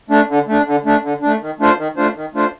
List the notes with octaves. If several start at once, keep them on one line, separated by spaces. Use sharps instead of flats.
A3 D4
D3
A3 D4
D3
A3 D4
D3
A3 D4
D#3
A3 D4 F4 C5
D#3
A3 D4 F4 C5
D#3
A3 D4 F4 C5